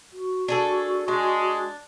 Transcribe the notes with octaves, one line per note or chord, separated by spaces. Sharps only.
F#4
D4 G#4 A4
G#3 D4